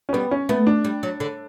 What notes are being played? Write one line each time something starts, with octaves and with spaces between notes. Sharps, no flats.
C#4
G3 B3
C#4
A3 B3
D4
G3
F#3
D3